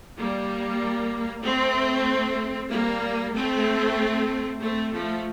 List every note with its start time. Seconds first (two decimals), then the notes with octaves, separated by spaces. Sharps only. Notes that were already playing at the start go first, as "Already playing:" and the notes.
0.17 G3 A#3
1.43 A3 C4
2.70 G3 A#3
3.33 A3 C4
4.60 A3 C4
4.92 F3 A3